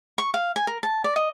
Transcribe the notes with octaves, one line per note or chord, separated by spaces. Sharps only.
C#6
F5
G#5
A#4
A5
D5
D#5